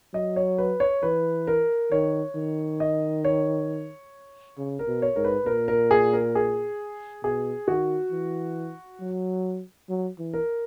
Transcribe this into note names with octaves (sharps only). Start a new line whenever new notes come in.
F#3 D#5
C#5
B4
C#5
E3 B4
A#4
D#3 C#5
D#3
D#5
C#5
C#3
A#4
B2
C#5
G#2 A#4
B4
A#2 A#4
A#4
G#4
A#4
G#4
B2 G#4
D#3 F#4
E3
F#3
F#3
E3
A#4